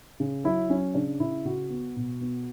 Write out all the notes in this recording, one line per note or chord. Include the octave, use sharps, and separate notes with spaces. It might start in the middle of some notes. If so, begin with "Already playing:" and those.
C#3
F#3 E4
F#3 C#4
C#3 D4
C#3 E4
C#3 F#4
B3
B2
B3